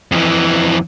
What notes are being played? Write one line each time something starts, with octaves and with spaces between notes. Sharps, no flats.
F2 E3